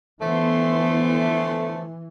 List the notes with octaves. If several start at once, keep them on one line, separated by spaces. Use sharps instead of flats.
D3 E3 F3 A3 B3 C6